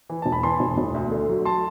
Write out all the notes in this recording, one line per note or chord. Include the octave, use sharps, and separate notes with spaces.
E3
E1 A5
B5
E3 A5 C6
E1
E1
D2
D3
F#3
A5 C6